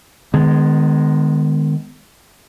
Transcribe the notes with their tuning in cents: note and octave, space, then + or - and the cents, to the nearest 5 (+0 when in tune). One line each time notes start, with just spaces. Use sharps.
D#3 -30 G#3 +0 B3 +20